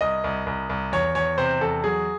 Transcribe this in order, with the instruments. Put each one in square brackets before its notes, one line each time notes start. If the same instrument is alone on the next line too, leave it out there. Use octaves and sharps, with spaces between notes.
[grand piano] C2 D#5
C2
C2
C2
E2 C#5
E2 C#5
C3 C5
E2 A4
F#3 G#4